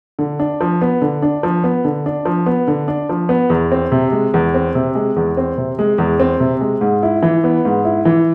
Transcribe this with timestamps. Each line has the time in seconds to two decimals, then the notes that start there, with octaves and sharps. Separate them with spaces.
0.19 D3
0.39 D4
0.61 F3
0.81 B3
1.02 D3
1.22 D4
1.43 F3
1.64 B3
1.85 D3
2.06 D4
2.25 F3
2.46 B3
2.68 D3
2.88 D4
3.09 F3
3.29 B3
3.50 E2
3.72 C4
3.92 C3
4.12 G#3
4.34 E2
4.54 C4
4.75 C3
4.95 G#3
5.16 E2
5.37 C4
5.58 C3
5.79 G#3
5.98 E2
6.20 C4
6.40 C3
6.61 G#3
6.81 G#2
7.03 E4
7.22 E3
7.44 B3
7.65 G#2
7.85 E4
8.05 E3